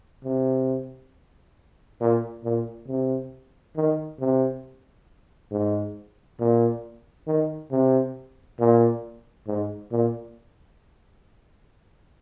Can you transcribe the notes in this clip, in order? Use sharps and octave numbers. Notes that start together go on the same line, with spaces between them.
C3
A#2
A#2
C3
D#3
C3
G#2
A#2
D#3
C3
A#2
G#2
A#2